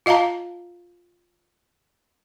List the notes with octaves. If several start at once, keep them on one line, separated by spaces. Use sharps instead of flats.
F4 D#5 F5 A5 A#5